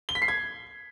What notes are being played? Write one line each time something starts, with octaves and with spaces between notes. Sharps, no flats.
G7
B6
C7
G#6